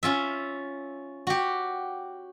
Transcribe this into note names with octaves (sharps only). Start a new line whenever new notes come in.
C#4 F4 E5
F#4 G4